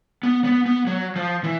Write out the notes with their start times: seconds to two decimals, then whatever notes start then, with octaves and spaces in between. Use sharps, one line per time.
0.23 B3
0.44 B3
0.66 B3
0.87 F#3
1.16 F3
1.44 E3